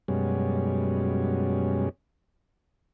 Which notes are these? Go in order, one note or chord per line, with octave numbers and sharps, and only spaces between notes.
F#2 B2 G3 G#3 C#4